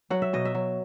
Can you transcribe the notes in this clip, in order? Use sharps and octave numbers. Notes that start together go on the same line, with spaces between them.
F#3 F#5
E5
B2 D#5
E5
F#3